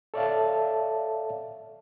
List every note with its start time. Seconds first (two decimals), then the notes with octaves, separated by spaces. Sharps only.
0.14 A4 C#5 D5 E5 F5 A5